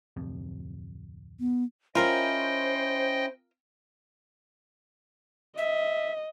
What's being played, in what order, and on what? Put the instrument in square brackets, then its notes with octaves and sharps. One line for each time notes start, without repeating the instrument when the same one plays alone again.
[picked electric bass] D1 F2 C3
[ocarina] B3
[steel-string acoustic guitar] C#4 E4 [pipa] F4 A#4 [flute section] C5 [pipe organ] D#5 G5
[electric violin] D#5 [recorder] E5